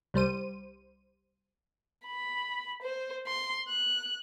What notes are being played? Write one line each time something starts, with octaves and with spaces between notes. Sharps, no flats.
C2 G3 C5 D#7
B5
C5
C6
F#6